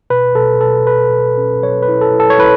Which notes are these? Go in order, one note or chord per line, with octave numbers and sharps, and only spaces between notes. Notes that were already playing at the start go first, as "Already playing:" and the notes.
B2 B4
B2 A4
B2 A4
B2 B4
B2
C#4
F#3 C#5
B4
E4
A4
E4
A4
C#5
E4 B4